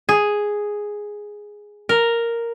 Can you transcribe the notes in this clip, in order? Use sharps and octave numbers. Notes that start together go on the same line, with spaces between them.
G#4
A#4